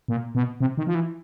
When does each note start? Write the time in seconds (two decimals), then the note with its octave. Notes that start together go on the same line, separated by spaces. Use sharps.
0.08 A#2
0.35 B2
0.61 C3
0.78 D#3
0.87 F3
0.95 E3